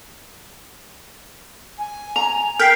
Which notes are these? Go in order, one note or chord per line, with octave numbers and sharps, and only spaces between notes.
G#5
A#5 F7
A#4 G5 F6 B6 C7